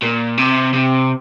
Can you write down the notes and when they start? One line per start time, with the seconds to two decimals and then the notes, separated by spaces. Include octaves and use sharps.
0.02 A#2
0.38 C3
0.74 C3